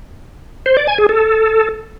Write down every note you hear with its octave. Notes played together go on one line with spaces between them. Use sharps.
C5
D5
G#5
G#4
A4